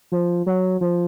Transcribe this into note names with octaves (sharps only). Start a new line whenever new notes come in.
F3
F#3
F3